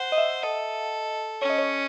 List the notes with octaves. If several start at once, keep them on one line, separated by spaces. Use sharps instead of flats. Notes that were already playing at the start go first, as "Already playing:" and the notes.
Already playing: C5 F#5
D#5
E5
A4 D#5
C#4 C#5
D#5
C#5